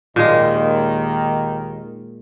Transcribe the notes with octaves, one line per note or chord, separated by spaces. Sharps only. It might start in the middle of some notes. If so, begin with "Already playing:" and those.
D#2 A#2 D#3 G#3